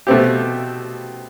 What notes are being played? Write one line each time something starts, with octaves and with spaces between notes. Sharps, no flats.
B2 A3 C4 G4